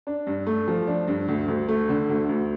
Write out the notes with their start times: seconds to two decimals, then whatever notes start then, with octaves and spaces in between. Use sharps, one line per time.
0.07 D4
0.27 G2
0.47 A3
0.68 F3
0.87 D4
1.08 G2
1.28 D2
1.48 D2
1.69 A3
1.89 D3
2.09 D2
2.29 D2